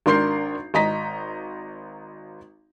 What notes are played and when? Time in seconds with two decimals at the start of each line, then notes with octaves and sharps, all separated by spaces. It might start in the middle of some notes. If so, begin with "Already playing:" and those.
0.06 G#1 D4 A#4 C6 G6 C7
0.74 G#1 D#5 A#5 B6